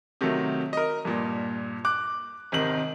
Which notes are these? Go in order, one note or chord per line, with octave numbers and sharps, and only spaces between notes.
C3 D#3 F#3 A3
A#4 D#5
G2 A#2
D6 F#6
G#1 C3 D#3 F#7